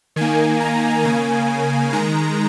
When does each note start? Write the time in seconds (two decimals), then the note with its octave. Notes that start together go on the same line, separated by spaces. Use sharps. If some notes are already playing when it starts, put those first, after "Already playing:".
0.16 D#3 A#3 G#5
0.60 A#5
1.05 C#3 A#3 G#5
1.92 D#3 G#3 A#5